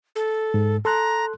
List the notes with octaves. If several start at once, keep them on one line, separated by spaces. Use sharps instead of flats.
A4
G#2
A4 A#5 C6 F#6